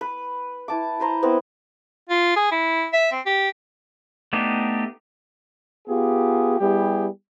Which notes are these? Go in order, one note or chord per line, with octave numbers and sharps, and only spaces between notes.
B4
E4 A5 D6
B4 C5 A#5
B3 C4 E4 A#4
F4
G#4
E4
E5
C4
G4
A3 B3 D4 D#4 G4
B3 F4 G4 G#4
G3 B3 E4 G4 G#4